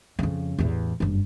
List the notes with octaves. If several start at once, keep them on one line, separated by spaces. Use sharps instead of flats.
F2 C#3
A1 E2
F#1 G2